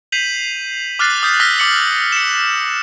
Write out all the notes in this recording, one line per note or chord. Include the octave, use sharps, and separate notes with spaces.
G6 B6 C7 D#7 F7 F#7
D6 F6 F#6 A6 C7
D#6 G6 B6
E6 F6 A#6 B6 G7
D6 C#7 F#7
C#7 E7